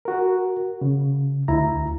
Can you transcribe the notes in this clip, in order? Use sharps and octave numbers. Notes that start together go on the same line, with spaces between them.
F#4 A#4
C#3
D2 E4 A#5